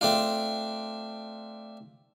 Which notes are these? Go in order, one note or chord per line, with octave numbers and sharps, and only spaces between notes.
A3 C4 D4 F4